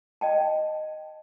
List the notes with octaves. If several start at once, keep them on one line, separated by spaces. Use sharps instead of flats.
D#5 G5 A5